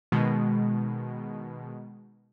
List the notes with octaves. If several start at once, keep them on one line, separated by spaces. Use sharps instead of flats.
B2 D#3 G#3